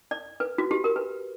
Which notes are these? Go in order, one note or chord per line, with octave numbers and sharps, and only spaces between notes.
D5
B4
F#4
G4
A#4
B4